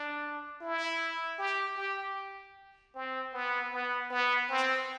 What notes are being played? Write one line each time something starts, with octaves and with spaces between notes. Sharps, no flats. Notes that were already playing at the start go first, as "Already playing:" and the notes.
Already playing: D4
E4
G4
G4
C4
B3
B3
B3
C4